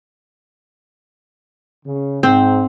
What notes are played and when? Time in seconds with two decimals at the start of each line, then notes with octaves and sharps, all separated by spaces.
1.86 C#3
2.23 G#2 C4